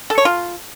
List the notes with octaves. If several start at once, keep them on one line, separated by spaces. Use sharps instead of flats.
A4
C#5
F4